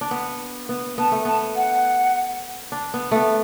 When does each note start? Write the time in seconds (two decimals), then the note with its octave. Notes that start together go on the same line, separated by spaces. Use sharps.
0.01 D4
0.11 B3
0.69 B3
0.98 B3 A5
1.12 A3
1.25 B3 A5
1.56 F#5
2.72 D4
2.94 B3
3.11 A3 B3